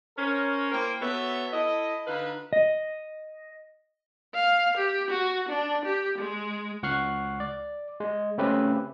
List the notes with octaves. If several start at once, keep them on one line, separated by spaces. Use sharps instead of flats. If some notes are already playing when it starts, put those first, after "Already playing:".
C#4 A#4 C5 C#5
A#3 E4 A#4 C5 G5
B3 F#4 A4 C#5 E5
E4 A4 D#5
D3 D#4 F4 B4
D#5
F5
G4
F#4
D4
G4
G#3
C#2 F#5 C#6 F6 F#6 C7
D5
G#3
C#3 A3 C4 C#4 G4 B4